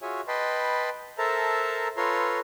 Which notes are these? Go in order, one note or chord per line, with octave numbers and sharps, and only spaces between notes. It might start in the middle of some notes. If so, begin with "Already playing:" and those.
F4 F#4 G#4 C#5 E5 G#5
B4 D#5 G5 A5 B5 C6
A4 A#4 C5 E5 A5 A#5
F4 A4 B4 C#5 A#5 C6